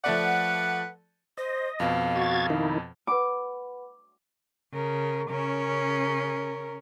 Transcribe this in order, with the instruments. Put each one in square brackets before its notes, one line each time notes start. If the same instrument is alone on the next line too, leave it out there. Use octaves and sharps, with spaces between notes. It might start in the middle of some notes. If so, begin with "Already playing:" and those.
[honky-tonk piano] F3 A3 D5 [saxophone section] B4 F#5
[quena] C5 [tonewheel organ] D#5
[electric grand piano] F2 B2 [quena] F5
[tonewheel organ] F#4 G#6 A6
D#3 D#4 E4
[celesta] B4 F#5 B5 [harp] D6
[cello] C#3 [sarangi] A#4
[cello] C#3 C#4 [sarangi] A#4